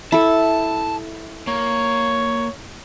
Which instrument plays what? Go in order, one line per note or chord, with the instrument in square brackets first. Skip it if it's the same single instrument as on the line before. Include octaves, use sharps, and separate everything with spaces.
[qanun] E4 A4 [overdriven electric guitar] A5
[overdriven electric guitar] A#3 [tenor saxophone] C#5